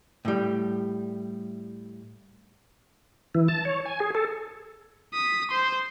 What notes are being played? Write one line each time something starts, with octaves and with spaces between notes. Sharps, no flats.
A2 G3
E3
A5
C#5
G#5
G#4
A4
D#6 B6
C5 C6